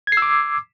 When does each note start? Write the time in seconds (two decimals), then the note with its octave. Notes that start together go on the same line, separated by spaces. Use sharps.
0.07 G#6
0.12 C7
0.17 E6
0.22 D6